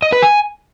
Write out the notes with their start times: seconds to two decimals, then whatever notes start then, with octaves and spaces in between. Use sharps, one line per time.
0.02 D#5
0.12 B4
0.23 G#5